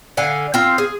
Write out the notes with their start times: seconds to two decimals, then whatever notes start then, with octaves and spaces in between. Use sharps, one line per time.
0.17 D3 F5 G#5
0.54 C4 F4
0.78 G#4